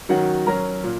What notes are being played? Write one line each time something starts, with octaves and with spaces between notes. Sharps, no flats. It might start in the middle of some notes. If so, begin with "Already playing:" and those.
D#3 F#3 C#4 F#4 F#5
F#3 C#4 A#4 A#5
A#2